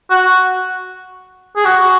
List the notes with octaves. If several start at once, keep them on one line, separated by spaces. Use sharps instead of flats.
F#4
G#4
F#4